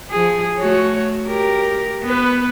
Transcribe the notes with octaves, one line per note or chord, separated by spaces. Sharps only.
F3 G#4
A3 F#4 C#5
G4 A#4
B3 B4